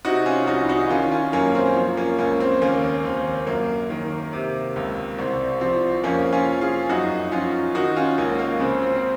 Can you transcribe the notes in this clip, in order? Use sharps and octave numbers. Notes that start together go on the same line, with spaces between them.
C3 D#4 F#4
C#4 F4
C2 D#4 F#4
D#4 F#4
D#3 C#4 F4
C#4 F4
F#2 A#3 C#4
C4
F3
A#3 C#4
C#2 A#3 C#4
C4
D#2 A#3 C#4
D#2 C4
F#2 A#3
D#3
C3
C#2
C2 C4
F3 C4
F2 A#3 C#4
C#4 F4
F2
F4 G#4
F#2 D#4 F#4
F3 C#4 F4
D#3 D#4 F#4
C#4 F4
C#2 A#3 C#4
A#3
C#3 C4
C4
C4